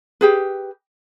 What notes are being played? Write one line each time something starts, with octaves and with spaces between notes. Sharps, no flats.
G4 G#4 B4